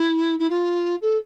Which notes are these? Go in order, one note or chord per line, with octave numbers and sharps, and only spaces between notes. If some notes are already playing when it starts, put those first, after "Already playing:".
Already playing: E4
E4
F4
A4